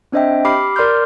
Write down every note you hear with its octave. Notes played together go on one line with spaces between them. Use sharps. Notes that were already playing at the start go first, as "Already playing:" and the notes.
C4 D4 C5 D#5 E5 G5
G4 B5 D6 F6 C7
A#4 D5 C6 D6 F6 G6